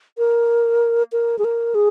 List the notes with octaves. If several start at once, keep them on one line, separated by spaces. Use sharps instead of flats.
A#4
A#4
G#4
A#4
G#4